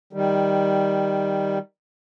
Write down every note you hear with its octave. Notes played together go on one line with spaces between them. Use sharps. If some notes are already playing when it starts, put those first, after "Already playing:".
D#3 G3